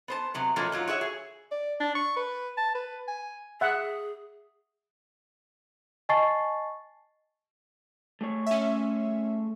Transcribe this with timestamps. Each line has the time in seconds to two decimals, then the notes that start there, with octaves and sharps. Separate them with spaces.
0.08 B3 C5 A5
0.34 C3 F#3 B3
0.56 B2 F3 F#3 A3 A#3 C#4
0.72 G#2 F#3 F4
0.88 F#4 G#4 C#5 E5
1.01 G#4
1.51 D5
1.80 D4
1.95 C#6
2.16 B4
2.57 A5
2.75 B4
3.08 G#5
3.61 G#4 E5 F#5
6.09 D#5 G#5 A5 C#6 A6 C7
8.21 A3 G#4 C#5
8.46 C#4 E5